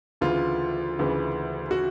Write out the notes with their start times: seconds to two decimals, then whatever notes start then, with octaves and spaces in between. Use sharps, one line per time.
0.21 D2 C#3 E3 F4
0.99 D2 C#3 E3
1.71 F#4